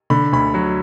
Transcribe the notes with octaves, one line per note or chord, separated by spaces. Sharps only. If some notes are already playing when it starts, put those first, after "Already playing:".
D3 B5
D2 B5
F#3